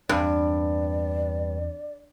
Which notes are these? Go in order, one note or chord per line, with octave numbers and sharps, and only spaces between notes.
E2 G2 C4 D5